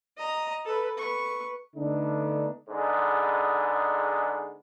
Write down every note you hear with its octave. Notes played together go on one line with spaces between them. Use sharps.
D#5 A#5
A4 B4
B4 C#6
D3 A3 B3 D4 D#4
G#2 D3 G#3 B3